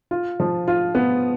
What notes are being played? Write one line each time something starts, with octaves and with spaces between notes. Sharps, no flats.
F4
F3
F4
B3